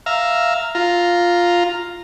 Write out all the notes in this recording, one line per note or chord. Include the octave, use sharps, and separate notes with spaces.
E5 F5 A#5
F4 A#5